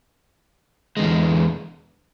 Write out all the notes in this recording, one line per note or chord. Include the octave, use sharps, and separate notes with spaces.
E2 D3 G#3